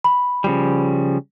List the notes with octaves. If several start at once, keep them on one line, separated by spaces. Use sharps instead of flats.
B5
C#3 F3 G3